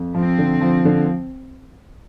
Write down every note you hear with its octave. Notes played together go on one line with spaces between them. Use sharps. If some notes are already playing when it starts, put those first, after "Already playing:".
Already playing: F2
F3 C4
D3
F3
D3